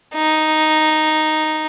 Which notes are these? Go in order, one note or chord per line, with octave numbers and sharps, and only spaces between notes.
D#4